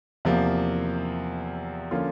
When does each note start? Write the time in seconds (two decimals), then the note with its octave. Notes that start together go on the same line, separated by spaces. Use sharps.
0.25 E2 C3 F3 A#3
1.91 D3 F3 A#3 C#4 F4